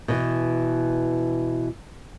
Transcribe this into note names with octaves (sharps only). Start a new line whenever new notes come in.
B2 E3